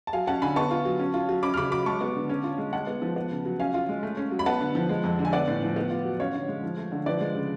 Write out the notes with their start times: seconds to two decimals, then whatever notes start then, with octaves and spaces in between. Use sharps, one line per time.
0.07 A5
0.13 F#3 F5 G#5
0.27 C#4 F#5 A5
0.42 D3 G#5 B5
0.56 B3 A5 C#6
0.71 F4
0.85 F#3
0.99 C#4
1.14 F4
1.29 F#3
1.43 C#4 B5 D6
1.54 F6
1.57 C#3 B5 D6
1.72 F#3 B5 D6
1.86 G#3 A5 C#6
2.01 B3
2.15 D3
2.29 C#4
2.44 F4
2.58 G#3
2.73 G#3 F#5 A5
2.87 B3
3.02 F3
3.16 B3
3.31 C#3
3.45 F#3
3.60 C#4 F5 G#5
3.74 F4
3.89 G#3
4.03 A3
4.17 C#4
4.31 F#3
4.39 B5
4.46 B3 F#5 A5
4.61 D3
4.75 F3
4.89 G#3
5.04 F2
5.19 D3
5.25 G#5
5.33 B3 D5 F#5
5.48 A2
5.62 F3
5.76 B3
5.90 F4
6.05 F#3
6.20 C#4 C#5 F5
6.34 D3
6.48 G#3
6.63 F3
6.78 A3
6.92 D3
7.06 F3 B4 D5
7.21 G#3
7.35 C#3